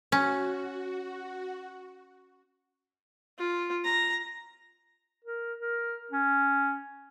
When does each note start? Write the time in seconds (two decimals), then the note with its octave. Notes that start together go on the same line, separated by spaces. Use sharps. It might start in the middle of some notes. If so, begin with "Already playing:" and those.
0.12 C#4 F#4
3.38 F4
3.84 A#5
5.24 A#4
5.59 A#4
6.11 C#4